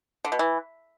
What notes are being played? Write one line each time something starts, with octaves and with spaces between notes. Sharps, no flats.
D3
B2
E3